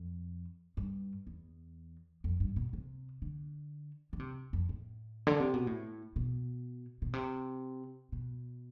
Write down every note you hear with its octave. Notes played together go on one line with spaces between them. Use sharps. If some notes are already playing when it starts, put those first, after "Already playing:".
Already playing: F2
G2
E2
F2
G2
B2
C3
D3
D3
C3
F2
A2
D3
C3
B2
A2
B2
B2
C3
B2